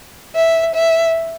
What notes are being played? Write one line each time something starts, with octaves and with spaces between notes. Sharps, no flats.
E5
E5